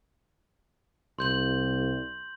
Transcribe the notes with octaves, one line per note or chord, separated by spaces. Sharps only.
C2 C6 G6 F#7